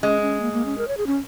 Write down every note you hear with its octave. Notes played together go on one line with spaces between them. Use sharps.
G#3 C#4
C#4
A#3
A#3
C#4
A#4
C#5
G#4
C#4